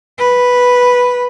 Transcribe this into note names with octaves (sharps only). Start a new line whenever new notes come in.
B4